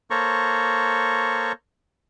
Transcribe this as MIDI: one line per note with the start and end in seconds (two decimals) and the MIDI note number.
0.10 1.52 58
0.10 1.52 69
0.10 1.52 72
0.10 1.52 73
0.10 1.52 82
0.10 1.52 85